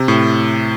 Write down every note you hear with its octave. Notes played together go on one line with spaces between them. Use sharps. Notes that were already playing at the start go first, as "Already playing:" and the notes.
Already playing: C3
A2